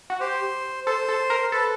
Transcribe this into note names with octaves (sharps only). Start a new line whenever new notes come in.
F#4
G4 C5
A4 C5
A4
A#4
A4 B4